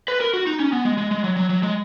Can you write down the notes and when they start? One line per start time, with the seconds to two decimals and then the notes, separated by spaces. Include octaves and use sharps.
0.08 B4
0.21 A#4
0.33 F#4
0.47 D#4
0.60 C#4
0.73 B3
0.85 G#3
0.98 G#3
1.11 G#3
1.24 F#3
1.36 F#3
1.50 F#3
1.63 G#3